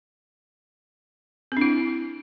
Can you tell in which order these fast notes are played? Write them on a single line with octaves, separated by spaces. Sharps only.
C4 D4 E4